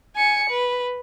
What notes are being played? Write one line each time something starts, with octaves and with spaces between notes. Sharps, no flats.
G#5 C#7
B4